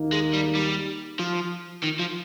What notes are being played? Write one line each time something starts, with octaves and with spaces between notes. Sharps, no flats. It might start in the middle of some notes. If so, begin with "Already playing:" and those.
Already playing: D#2 D#3 A#3 D#4
G#3
G3
G3
F3
D#3
F3